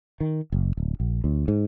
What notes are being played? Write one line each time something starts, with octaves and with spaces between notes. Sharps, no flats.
D#3
F#1
D1
A#1
D2
G#2